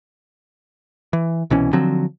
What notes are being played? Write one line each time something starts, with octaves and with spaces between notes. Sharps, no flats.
E3
C2 B2 E3 C#4
D3 F3 F#3 C4